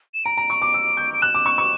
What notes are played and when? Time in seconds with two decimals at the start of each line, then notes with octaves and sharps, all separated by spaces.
0.14 E7
0.25 A#5 D7
0.37 A#5
0.50 C#6
0.62 D6
0.74 E6
0.97 G6
1.14 D7
1.21 F#6 E7
1.35 D6
1.46 C#6
1.58 C#6